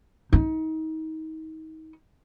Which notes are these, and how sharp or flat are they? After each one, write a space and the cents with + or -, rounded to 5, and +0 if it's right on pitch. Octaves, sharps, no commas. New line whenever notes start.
D#4 +30